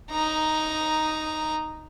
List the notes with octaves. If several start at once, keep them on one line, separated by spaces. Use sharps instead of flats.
D#4 A#5